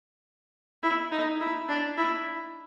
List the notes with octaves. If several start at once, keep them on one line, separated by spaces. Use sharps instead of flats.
E4
D#4
E4
D4
E4